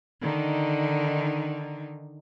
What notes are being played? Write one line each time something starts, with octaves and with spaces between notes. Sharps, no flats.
D3 D#3 D#4